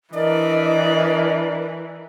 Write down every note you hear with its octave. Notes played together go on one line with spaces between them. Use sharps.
E3 D4 A#4 D5 D#5